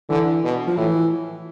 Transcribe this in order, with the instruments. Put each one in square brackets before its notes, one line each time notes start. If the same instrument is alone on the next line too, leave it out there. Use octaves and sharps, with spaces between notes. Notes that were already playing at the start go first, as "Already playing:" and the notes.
[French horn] D3 [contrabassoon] E3
[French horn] B2
[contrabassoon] F3
[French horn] A2 [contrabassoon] E3